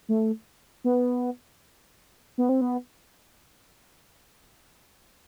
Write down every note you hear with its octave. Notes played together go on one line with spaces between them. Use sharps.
A3
B3
B3
C4
B3